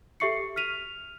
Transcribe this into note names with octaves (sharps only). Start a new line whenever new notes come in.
G4 A4 E5 C#6 C7 C#7
F6 B6 D#7 F7